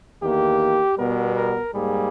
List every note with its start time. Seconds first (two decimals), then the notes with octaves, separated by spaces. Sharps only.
0.22 E2 D#3 A#3 G4
0.98 B2 G3 B3 A#4
1.36 A#4
1.74 G#2 G3 A#3 G#4